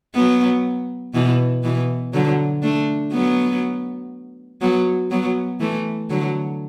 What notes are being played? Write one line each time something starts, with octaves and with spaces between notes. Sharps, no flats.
F#3 B3
B2 E3
B2 E3
D3 F#3
A3 D4
F#3 B3
F#3 B3
F#3 B3
E3 A3
D3 F#3